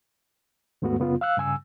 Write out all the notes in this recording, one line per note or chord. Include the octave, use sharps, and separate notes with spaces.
D#2 G#2 A3 B3 F#4
F#2 C#3 B3 F4
F5 E6 F#6
G2 C#3 G#5 E6